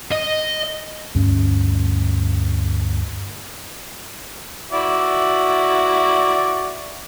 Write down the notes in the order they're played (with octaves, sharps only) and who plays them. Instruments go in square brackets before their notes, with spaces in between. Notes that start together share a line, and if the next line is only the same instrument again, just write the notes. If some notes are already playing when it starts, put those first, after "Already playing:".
[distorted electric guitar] D#5
[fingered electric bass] D2 G2 G3 C#4
[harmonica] E4 F#4 D5